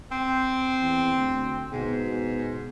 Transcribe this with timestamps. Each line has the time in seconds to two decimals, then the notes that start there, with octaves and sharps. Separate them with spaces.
0.11 C4
0.81 E2
1.16 D2
1.72 G#2 B2